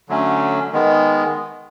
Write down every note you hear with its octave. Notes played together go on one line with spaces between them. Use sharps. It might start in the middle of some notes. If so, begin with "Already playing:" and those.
D3 F#3 A3 C#4
D#3 G#3 B3